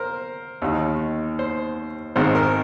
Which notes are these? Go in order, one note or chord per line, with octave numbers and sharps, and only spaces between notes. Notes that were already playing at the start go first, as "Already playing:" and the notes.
Already playing: A#4 C5
D#2 D#3
C5
G#1 G#2 D#3 C5
A#4